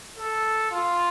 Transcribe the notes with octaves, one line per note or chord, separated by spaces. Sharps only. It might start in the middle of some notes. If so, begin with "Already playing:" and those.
A4
F4